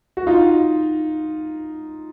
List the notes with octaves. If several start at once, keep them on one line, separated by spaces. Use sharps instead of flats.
F#4
D#4 F4